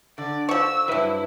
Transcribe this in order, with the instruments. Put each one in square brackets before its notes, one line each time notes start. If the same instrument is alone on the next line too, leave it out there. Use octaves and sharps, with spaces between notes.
[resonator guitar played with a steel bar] D3 [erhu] D5
[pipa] F3 C#6 [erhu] E6
[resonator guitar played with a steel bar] G2 F#3 [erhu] E4 [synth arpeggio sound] B4 E5